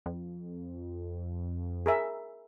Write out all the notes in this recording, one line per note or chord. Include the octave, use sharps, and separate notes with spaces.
F2
G#4 A#4 E5